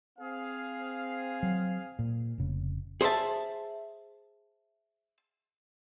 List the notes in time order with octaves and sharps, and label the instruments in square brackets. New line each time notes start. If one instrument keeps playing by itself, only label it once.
[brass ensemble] C4 G#4 F5
[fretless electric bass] F#3
A#2
F1 C#3
[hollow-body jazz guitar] G#4 C5 C#5 E5 A5